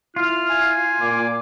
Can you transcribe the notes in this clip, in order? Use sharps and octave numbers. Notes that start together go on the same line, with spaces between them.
E4 F4 F6
G#5
A#2 D6